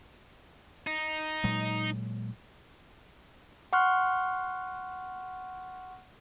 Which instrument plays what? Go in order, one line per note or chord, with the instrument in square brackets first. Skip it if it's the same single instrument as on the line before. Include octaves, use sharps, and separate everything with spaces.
[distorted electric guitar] D#4
[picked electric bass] A#2 F#3 G#3
[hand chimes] F#5 C6 C#6 F6 F#6